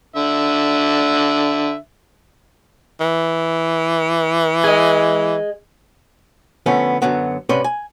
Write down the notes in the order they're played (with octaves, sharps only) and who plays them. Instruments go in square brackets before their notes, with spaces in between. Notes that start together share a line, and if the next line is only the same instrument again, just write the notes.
[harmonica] D3 E5
[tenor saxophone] E3
[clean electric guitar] G#4 D#5
[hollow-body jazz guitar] D3 F3 A3 B3 C#4
F#2 D3 F#3 B3
G#2 C3 C#4 B4 D5 C6
G#5